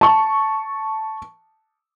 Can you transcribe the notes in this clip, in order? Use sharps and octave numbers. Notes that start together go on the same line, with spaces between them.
A5 C#6